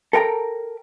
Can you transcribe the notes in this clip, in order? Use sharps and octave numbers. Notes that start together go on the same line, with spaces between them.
A4 A#4 G5 A#5